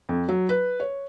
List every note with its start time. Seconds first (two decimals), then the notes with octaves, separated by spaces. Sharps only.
0.09 F2
0.28 F#3
0.49 B4
0.80 C#5